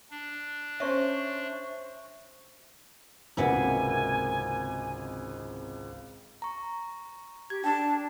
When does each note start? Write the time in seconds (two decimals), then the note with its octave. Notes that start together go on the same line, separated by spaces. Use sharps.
0.10 D4
0.80 C#4 C5 E5 C#6
3.37 G#1 C#2 C3 A#3 B3 E4 G#5
6.42 A#5 C#6
7.50 G4 G#6
7.64 D4 G5 A5